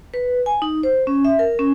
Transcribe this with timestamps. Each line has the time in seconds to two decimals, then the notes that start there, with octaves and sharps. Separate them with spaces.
0.14 B4
0.46 G#5
0.62 D#4
0.83 C5
1.07 C#4
1.24 E5
1.39 A#4
1.59 C#4